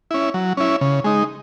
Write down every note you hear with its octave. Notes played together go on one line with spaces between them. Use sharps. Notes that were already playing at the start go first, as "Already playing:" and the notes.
C#4 E4
F#3
C#4 E4
C#3
G#3 D#4